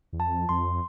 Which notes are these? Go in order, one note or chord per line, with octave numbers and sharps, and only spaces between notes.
E2
F2 A5
F2 C6